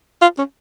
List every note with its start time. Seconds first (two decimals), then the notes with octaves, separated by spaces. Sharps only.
0.22 F4
0.38 C#4